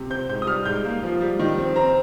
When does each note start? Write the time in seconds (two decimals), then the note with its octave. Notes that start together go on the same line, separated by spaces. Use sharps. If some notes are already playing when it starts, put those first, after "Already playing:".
Already playing: C3
0.10 C4 G6
0.29 G#2 G6
0.42 D#6
0.47 G3 F6
0.65 G#2 G6
0.85 A#3
1.03 F3
1.21 G3
1.39 D#3
1.58 C4
1.76 C4 A#5